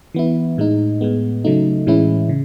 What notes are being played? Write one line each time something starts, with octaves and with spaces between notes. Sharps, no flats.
E3 B3 E4
A2 G#3 D#4
A2 G#3 B3
C#3 F#3 A3 D#4
A2 E3 G#3 C#4 E4
C#3